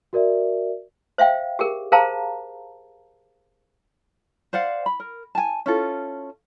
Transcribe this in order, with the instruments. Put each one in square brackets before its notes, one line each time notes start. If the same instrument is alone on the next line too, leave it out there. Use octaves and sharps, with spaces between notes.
[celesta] F#4 A#4 D5 E5
[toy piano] C5 E5 F5 G5
G4 G#4 A#4
G#4 A#4 C5 F5 A5 A#5
[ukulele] C5 D5 F5 F#5
B5
A#4
G#5 A5
C#4 E4 F4 A4